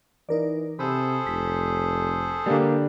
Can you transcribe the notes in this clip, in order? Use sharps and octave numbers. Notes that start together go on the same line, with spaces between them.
E3 D#4 A#4 D5
C3 G#4 A4 C5 B5 D#6 E6
F1 B6
D3 G3 A#3